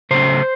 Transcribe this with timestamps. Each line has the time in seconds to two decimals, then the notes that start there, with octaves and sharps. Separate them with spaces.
0.11 C#3 F#3 A3 C#4 C5